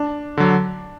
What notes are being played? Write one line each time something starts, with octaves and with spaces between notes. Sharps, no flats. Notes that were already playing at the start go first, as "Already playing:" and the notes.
Already playing: D4
D3 F#3